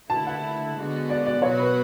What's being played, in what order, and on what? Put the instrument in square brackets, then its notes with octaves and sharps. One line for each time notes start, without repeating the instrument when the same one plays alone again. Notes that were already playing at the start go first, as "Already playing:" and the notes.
[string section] D3 A3 E4 [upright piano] A5
[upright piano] F#5
[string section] D3 G#3 B3 F#4
[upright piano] D5
D5
[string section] B2 F#3 B3 F#4 [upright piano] C#5
[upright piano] B4